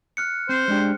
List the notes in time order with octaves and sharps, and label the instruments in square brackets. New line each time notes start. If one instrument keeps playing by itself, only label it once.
[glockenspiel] F6 F#6 C#7
[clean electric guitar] C4 [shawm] C5
[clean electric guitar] G#3 D4 G4